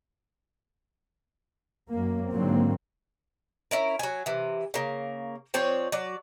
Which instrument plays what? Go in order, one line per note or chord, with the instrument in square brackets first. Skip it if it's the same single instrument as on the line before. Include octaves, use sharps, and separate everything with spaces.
[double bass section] F#2 A#3
G#2 D3 F#3 A#3 C4
[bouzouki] C#4 E4 A#4
F#3 G#5
C3 E3
C#3 A#3
F3 C4 C#5 D5
F#3 D5